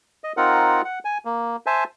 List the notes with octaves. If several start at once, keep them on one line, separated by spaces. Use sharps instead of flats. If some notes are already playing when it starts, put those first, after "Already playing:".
D#5
C4 D#4 F4 A#4 F#5
F#5
G#5
A#3
C5 E5 G#5 A5